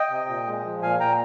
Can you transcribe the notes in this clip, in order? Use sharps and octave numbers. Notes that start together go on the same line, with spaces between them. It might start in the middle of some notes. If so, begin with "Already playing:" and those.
Already playing: D#5 G5
C3
A#2
G#3
F3
A#2 F5 G#5
A#2 G5 A#5